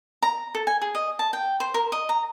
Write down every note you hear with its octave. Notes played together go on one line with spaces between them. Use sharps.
A#5
A4
G#5
G#4
D#5
A5
G5
C5
A#4
D#5
A#5